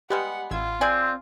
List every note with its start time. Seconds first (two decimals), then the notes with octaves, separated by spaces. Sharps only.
0.10 G3 G#3 B3 G4 F#5
0.51 A1 F4 E6 G#6
0.81 C4 G#4 D5 G#5 D7